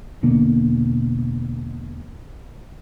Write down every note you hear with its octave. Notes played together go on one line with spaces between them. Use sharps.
E1 B2 D3 A#3